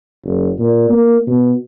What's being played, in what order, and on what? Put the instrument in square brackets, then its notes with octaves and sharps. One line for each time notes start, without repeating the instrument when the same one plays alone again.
[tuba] F#1
A#2
A#3
B2